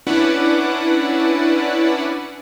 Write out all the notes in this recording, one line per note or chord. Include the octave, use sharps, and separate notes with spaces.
C#4 D4 E4 B4 D5 F#5